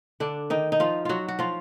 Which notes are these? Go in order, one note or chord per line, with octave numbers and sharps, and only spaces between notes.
D3 D4
D#3 D#4
D#4
F3 F4
F#3 F4 F#4
F#4
F3 F4